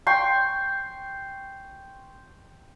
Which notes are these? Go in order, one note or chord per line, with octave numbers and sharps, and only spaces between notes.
G5 C6 C#6